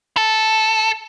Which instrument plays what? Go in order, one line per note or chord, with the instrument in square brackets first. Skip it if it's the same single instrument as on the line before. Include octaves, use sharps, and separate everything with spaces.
[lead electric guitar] A4